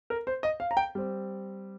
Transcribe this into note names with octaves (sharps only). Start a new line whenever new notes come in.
A#4
C5
D#5
F5
A#5
G5
G3 C4